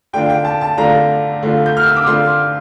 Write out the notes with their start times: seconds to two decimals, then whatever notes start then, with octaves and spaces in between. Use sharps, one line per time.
0.13 D3 A3 D4 F4 G5
0.30 G5
0.45 A5
0.61 A5
0.77 D3 A3 D4 F4 A#5
1.42 D3 A3 D4 F4
1.66 G6
1.77 F6
1.87 E6
1.96 D6
2.06 D3 A3 D4 F4 C6